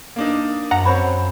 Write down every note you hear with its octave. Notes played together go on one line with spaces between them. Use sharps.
A#3 D4 D#4
F#2 F#5 A#5
C4 C5 C#5 B5